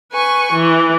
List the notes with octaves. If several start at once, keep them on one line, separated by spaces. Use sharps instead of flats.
B4 G#5 C#6
E3